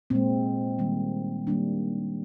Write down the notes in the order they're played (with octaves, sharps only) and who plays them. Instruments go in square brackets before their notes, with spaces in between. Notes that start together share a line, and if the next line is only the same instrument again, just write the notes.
[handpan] A#2 G#3 C4
D#3 G3 A#3
D#3 G3 A#3 D4